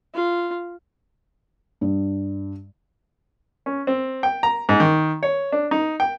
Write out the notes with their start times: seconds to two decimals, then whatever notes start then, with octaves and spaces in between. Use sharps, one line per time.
0.15 F4
1.81 G2
3.66 C#4
3.87 C4
4.23 G5
4.43 A#5
4.69 G#2
4.80 D#3
5.23 C#5
5.52 D4
5.71 D#4
6.00 G5